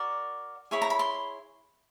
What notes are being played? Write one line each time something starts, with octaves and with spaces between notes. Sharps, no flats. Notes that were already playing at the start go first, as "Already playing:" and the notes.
Already playing: F#4 A#4 D5
E4 G#4 C#5 B5
A#5
B5
C6